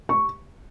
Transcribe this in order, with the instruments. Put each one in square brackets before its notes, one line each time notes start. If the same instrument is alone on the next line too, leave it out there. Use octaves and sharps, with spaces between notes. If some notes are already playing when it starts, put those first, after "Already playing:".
[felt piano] C#6